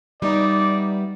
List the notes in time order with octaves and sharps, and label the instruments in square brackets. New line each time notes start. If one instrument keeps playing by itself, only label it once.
[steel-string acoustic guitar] G3 B3 E4 [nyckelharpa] D#4 [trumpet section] D5